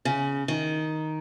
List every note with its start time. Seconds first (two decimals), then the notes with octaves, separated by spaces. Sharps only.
0.05 C#3
0.48 D#3